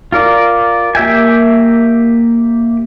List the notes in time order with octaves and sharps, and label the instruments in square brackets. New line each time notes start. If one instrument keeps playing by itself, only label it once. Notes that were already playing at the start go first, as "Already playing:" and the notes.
[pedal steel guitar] F4 A#4 D5
A#3 G4 E5 G5 G#5